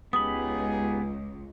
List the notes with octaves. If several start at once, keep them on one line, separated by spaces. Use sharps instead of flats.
C#2 B3 D#4 G4 G#4 B5 D#6